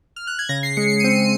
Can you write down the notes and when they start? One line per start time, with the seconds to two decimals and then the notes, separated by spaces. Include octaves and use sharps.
0.16 F6
0.27 F#6
0.39 G#6
0.49 C#3 A#6
0.63 C7
0.77 G#3 C#7
0.90 C#7
1.00 C4 D#7
1.10 C#7